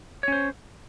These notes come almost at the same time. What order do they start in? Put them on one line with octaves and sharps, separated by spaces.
C#5 C#4 C5